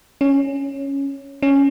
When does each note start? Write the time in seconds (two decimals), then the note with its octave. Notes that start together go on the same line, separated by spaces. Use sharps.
0.21 C#4
1.43 C#4